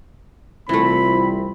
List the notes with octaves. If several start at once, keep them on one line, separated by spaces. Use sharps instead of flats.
C2 E3 A3 C4 F4 B5